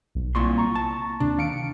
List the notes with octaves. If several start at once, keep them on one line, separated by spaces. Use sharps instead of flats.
B1
C2 A#2 C6 C#6
A#5 C#6
A5
D#2 C3 D4
D#3 F5 C#7 D7